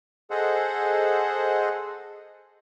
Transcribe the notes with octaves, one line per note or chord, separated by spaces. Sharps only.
G#4 A4 C5 D#5 F#5